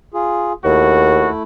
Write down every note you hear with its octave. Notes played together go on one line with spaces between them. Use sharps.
F4 G#4
D#2 A3 E4 F#4